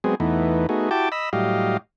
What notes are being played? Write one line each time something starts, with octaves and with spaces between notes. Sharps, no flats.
F#3 G#3 B3 C4 G#4
E2 E3 A3 B3 D#4
A3 B3 D#4 F#4 G#4
E4 F#4 G4 G5 A5 D6
D#5 B5 E6
A2 F#3 G3 G4 D#5 F5